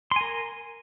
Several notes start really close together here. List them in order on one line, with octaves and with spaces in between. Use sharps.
C6 G#5 A#4